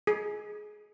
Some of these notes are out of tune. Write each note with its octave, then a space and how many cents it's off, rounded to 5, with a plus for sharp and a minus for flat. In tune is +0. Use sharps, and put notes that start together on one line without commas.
G#4 +20